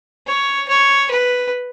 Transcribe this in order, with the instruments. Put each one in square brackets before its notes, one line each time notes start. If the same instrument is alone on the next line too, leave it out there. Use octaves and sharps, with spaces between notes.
[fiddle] C#5
C#5
B4